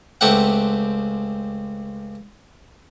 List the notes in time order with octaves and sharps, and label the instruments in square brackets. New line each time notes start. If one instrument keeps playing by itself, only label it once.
[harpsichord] C#2 A3 C4 G4 F#5